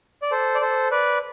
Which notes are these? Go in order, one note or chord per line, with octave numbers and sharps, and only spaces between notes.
D5
A4 C5
D5
A4 C5
B4 D5